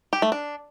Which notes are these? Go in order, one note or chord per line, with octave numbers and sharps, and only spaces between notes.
G4
A3
D4